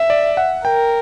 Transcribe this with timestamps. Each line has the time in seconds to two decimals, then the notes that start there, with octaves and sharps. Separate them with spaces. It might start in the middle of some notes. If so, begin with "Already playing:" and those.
Already playing: E5
0.10 D5
0.37 F#5
0.65 A#4 G5